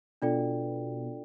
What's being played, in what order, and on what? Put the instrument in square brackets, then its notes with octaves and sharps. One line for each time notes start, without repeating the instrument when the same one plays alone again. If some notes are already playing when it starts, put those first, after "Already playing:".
[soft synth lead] B2 [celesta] D4 F4 A4 D5 G5